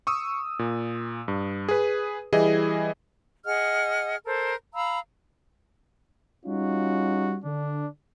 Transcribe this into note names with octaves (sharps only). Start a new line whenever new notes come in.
C#6 D#6 E6
A#2
G2
G#4 B4
E3 G3 E4 G#4 D#5
G#4 D#5 F#5 F6
A4 A#4 C5
F5 A#5 B5 E6
G3 C#4 D#4 F4 F#4
D3 D4